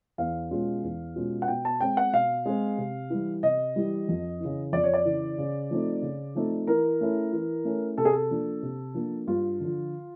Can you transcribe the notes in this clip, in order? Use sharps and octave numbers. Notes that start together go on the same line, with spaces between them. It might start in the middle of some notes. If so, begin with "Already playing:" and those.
E2 F5
B2 G#3 C#4 F4
E2
B2 G#3 C#4 F4
F#5
B2 G5
A5
G#3 C4 G5
F#5
B2 F5
G#3 C4
C3
E3 G3
C3 D#5
E3 G3
F2
C#3 E3
F2 D5
C#5
D5
C#3 E3
C#3
F3 A3 C4 D#4
C#3
F3 A3 C4 D#4
E3 A#4
A3 C#4 E4
E3
A3 C#4 E4
C3 A4
G#4
A4
F3 A#3 D4
C3
F3 A#3 D4
G2 F4
D3 F3